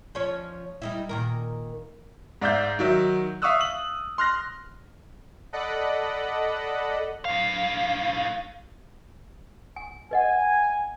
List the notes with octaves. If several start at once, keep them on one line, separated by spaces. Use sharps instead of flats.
F3 C#4 C#5
G3 D#4 E4
A#2 D#3 A#4
G#2 D5 E5 F5 G6
D#3 F#3 E5
E5 F5 C#6 D#6 E6 F#6
F#7
C6 F6 F#6 A#6
A4 D5 D#5 F#5 B5 F#6
A2 F5
G#5
B4 D#5 F#5 G#5